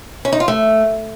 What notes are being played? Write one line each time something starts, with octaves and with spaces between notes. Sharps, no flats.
C#4
D#4
F4
A3